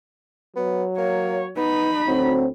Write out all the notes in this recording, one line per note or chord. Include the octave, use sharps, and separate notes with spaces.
F#3 B3
A#3 C#5
B3 D#4 B5
D2 F#3 C4